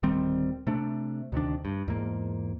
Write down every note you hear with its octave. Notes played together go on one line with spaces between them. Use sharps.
D1 D#3 G3 C4
C3 A3 D4
D2 C3 D#3 D4
G2
E2 G#2 A#3